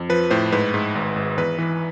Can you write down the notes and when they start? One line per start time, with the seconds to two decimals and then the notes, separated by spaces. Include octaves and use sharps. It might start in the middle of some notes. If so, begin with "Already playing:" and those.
Already playing: F2
0.09 F3 B4
0.31 A2 C5
0.52 G#2 B4
0.74 G#2
0.95 G#1
1.16 G#1
1.37 E2 B4
1.58 E3